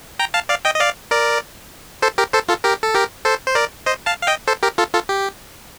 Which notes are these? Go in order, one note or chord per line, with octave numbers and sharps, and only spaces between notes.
G5 A#5
F5 A5
D5 F5
D#5 G5
D#5
D5 F5
A#4 D5
A4 C5
G4 A#4
A4 C5
F4 A4
G4 A#4
A4
G4 A#4
A4 C5
C5
A#4 D5
C5 D#5
F5 A5
F5
D#5 G5
A4 C5
G4 A#4
F4 A4
F4 A4
G4